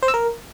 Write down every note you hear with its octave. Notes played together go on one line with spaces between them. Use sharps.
C5
E6
A#4